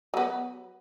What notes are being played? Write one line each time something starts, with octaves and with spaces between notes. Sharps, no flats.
F#3 B3